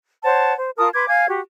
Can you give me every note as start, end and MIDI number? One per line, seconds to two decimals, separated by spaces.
0.24 0.53 72
0.24 0.53 73
0.24 0.53 78
0.24 0.53 81
0.57 0.70 72
0.77 0.89 65
0.77 0.89 70
0.77 0.89 81
0.77 0.89 87
0.93 1.08 71
0.93 1.08 84
0.93 1.08 86
0.93 1.08 92
1.08 1.25 77
1.08 1.25 80
1.08 1.25 92
1.29 1.40 66
1.29 1.40 67